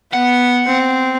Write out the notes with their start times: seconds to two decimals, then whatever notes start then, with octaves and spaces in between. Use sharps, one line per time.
0.14 B3 F#5
0.66 C4